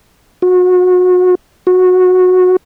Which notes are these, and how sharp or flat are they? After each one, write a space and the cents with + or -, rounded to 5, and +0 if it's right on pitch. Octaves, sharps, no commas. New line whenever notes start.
F#4 -30
F#4 -15